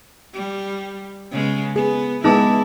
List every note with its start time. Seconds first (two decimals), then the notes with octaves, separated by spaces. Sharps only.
0.33 G3
1.31 C#3 G#3 B3
1.76 B3 G#4
2.24 G#3 B3 D#4 E4 G#4 A5 D6